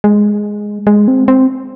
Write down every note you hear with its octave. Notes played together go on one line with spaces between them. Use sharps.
G#3
G#3
C4
C4